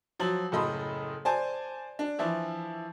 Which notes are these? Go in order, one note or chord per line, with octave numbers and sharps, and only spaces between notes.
F3 F#3 F#7
F#1 A2 A4 D#5 B5 C6
C5 D5 G#5 A5
D4
E3 F3 E4